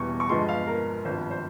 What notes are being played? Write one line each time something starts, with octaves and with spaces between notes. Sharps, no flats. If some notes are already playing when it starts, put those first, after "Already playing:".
Already playing: E1 E2 E3 G3 C#6
C#6
G1 G2 F3 G#3 C6
F5
A#4
G#1 G2 F3 C5
C5